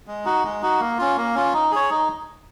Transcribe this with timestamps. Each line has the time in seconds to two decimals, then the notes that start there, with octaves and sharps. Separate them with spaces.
0.07 G#3
0.25 D#4 F#4
0.44 G#3
0.62 D#4 F#4
0.80 A#3
0.98 C#4 F4
1.17 A#3
1.35 C#4 F4
1.54 D#4
1.72 G#4 C#5
1.90 D#4